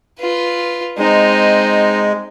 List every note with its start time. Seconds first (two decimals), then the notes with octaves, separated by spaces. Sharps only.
0.19 F4 B4
0.98 G#3 C4 D#4